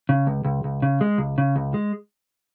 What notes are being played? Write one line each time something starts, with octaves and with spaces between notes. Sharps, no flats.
C#3
C#2
C#2
C#2
C#3
G#3
C#2
C#3
C#2
G#3